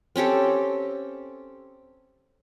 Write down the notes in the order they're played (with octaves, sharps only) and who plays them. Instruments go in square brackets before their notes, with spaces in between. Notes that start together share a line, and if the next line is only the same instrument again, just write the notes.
[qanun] C4 C#4 G4 A4